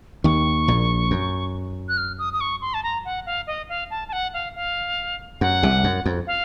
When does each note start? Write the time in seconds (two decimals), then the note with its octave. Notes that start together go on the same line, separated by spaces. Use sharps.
0.24 D#2 D#3 C#6
0.68 A#1 A#2
1.11 F#2
1.88 F#6
1.97 F6
2.19 D#6
2.33 D#6
2.41 C#6
2.61 C6
2.74 A5
2.83 A#5
3.05 F#5
3.26 F5
3.47 D#5
3.69 F5
3.90 A5
4.08 A5
4.13 F#5
4.34 F5
4.56 F5
5.41 F#2 F#5
5.63 C2 C3
5.84 F#2
6.06 F2
6.27 F5